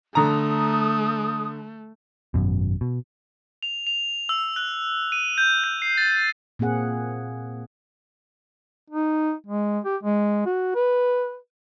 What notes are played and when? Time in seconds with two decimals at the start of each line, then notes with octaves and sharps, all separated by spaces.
0.15 D3 A3 A#5 D#6
2.34 G#1 F#2 B2
2.81 B2
3.63 F7
3.87 F7
4.29 E6
4.56 F#6
5.12 D#7
5.38 G6
5.64 G6
5.82 C7
5.98 A6
6.59 A#2 A#3 C4 G#4 F#5
8.90 D#4
9.47 G#3
9.85 G4
10.03 G#3
10.46 F#4
10.75 B4